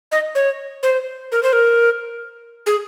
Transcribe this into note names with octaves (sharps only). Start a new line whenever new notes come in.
D#5
C#5
C5
A#4
C5
A#4
G#4